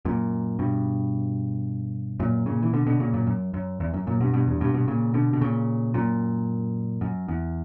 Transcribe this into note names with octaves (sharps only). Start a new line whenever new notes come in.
F#2 A#2
G2 B2
F#2 A#2
A#2 C#3
E3
B2 D3
B2 D3
A#2 C#3
F#2 A#2
F#2
F#2
E2
F#2
F#2 A#2
G2 B2
G2 B2
E2 G2
G2 B2
G2 B2
A#2 C#3
B2 D3
B2
A#2 C#3
F#2 A#2
F#2
E2